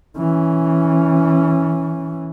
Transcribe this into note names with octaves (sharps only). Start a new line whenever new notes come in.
E3 C#4